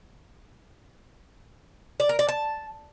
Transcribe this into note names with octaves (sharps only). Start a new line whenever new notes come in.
D5
A#4
D5
A5